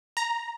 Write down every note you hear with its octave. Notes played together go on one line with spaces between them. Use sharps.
A#5